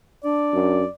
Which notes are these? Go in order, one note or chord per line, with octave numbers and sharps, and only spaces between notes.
D4 D5
F#2